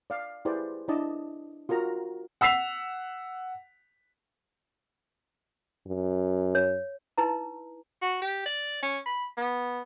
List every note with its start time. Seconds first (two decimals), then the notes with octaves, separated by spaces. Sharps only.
0.10 D5 F5
0.45 E4 G4 G#4 B4 C5 D5
0.88 D4 E4 D5 D#5 A5
1.69 F4 F#4 A#4 A#5
2.41 F#5 E6 B6 C7 F7
5.87 F#2
6.55 C#5
7.18 D#4 E4 B4 A#5
8.02 F#4
8.22 G4
8.46 D5
8.83 C#4
9.06 B5
9.37 B3